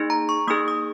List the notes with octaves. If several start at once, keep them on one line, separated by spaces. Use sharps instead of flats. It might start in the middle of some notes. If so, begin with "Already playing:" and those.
Already playing: A#3 D#4 G#4
A#5
C#6
A#3 D#4 G#4 D#6
D#6